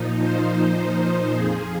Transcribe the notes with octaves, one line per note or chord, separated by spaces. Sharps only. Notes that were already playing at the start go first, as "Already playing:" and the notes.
Already playing: A#2 F3 D#4
C5
C5
F2 F3 G#4